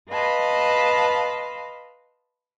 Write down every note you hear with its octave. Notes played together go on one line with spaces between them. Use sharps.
B4 D#5 F5 A5 B5 C6